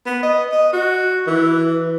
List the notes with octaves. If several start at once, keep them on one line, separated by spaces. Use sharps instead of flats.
B3
D#5
D#5
F#4
E3